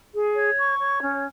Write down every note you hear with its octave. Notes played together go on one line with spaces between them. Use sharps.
G#4
C#5
C#6
C#5
C#4